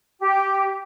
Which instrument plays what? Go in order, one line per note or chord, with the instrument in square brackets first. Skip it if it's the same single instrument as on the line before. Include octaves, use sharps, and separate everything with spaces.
[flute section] G4